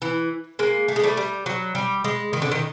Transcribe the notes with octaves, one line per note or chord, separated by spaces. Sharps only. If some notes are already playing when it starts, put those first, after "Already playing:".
E3
G#3 A#3
A3
G#3
G3 A3
G3
F#3
G3
G#3
D#3
D3
D#3